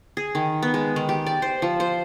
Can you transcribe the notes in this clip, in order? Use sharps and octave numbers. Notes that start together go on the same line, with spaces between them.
G#4
D#3
B3
G#3
D#3
G4
D5
C5
F3
C5